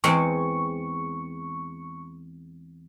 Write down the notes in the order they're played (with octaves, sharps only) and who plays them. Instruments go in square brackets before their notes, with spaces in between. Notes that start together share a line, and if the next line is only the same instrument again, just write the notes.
[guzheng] E2 G#3 C4 [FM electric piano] C#6